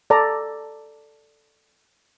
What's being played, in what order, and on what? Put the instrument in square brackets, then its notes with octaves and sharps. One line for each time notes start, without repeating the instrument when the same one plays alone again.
[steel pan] A4 D5 A5 A#5